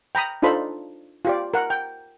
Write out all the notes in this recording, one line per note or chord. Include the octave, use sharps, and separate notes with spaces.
G5 A#5 B5 D#6
D4 D#4 F4 A4 C5 B5
F4 G4 D5
A#4 F#5
G5